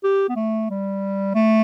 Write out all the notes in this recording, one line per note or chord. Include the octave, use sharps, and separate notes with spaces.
G4
B3
A3
G3
A3